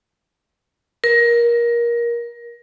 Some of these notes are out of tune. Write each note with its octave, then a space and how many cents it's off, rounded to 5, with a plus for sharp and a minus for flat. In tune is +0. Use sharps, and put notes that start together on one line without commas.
A#4 +20